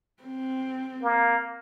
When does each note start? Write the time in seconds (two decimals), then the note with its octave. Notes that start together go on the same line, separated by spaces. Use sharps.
0.23 C4
1.03 A#3